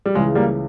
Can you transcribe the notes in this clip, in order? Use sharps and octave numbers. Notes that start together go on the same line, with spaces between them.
G3
C#2 C#3 E3 G#3
G3 A#3